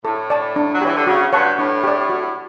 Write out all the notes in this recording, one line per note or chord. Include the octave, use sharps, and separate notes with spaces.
A2 A4
D5 A5
D4
F#3
E3 G4 C#5
D3
C#3 F#4
G2 C#5 F#5 A5 C#6
A2 D4
G4 D5
F#4